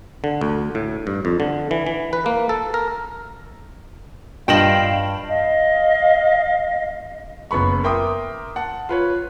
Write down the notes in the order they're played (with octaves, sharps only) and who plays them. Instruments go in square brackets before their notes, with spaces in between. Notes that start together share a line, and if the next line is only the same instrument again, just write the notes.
[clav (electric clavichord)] D3
D2
A2
G2
F2
D3
E3
E3
B4
A#3
A4
A#4
[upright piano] G2 [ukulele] F4 D#5 [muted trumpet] F5 [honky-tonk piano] G5 E7 F#7
[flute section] D#5 F5
[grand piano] F#1 B3 B5 C#6
A#4 E5 G5 C6 D6 D#6
F#5 A5
F4 B4 C#5